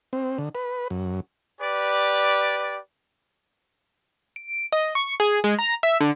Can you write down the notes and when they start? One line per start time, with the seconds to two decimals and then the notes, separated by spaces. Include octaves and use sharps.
0.13 C4
0.38 D3
0.55 B4
0.90 F#2
1.61 G4 B4 D5
4.36 D7
4.72 D#5
4.95 C#6
5.20 G#4
5.44 G#3
5.59 A#5
5.83 E5
6.00 D3